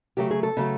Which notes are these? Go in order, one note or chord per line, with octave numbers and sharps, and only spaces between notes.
C#3 F#3 A3 G4
G#4
A4
C#3 F#3 A3